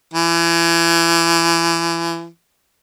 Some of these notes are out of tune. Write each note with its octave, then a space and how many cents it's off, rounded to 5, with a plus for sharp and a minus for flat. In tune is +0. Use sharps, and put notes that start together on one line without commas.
E3 +30